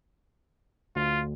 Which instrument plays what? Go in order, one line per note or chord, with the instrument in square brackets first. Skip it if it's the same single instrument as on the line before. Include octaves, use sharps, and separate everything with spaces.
[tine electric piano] D2 [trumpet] F4